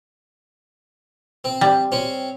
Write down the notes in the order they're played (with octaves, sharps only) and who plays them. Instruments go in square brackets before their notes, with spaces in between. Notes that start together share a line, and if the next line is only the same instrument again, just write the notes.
[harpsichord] C4
[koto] G3
[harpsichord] C4 C#4